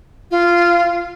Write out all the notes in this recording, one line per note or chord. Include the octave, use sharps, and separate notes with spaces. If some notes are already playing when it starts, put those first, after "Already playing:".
F4